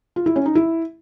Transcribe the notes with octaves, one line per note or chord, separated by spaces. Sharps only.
F4
E4
C#4
D#4
E4